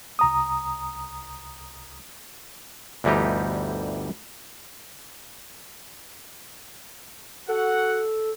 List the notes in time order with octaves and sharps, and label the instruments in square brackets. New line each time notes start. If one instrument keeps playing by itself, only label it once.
[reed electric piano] C2 A#5 D#6
[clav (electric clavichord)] G1 D2 E3 G3 D#4 G4
[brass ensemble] F#4 F#5 [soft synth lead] A4